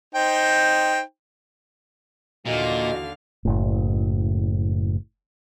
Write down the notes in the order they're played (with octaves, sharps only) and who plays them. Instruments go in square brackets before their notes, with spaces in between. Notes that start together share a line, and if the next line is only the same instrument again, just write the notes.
[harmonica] D#4 C5 G5
[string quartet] D#2 D3 F5 [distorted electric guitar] A#2 [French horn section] E3 F#4 [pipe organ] D#5
[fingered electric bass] F#1 A2